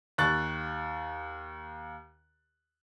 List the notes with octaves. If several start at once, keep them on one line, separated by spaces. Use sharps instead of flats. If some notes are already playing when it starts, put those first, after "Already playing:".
D#2 C#6 F#6 A6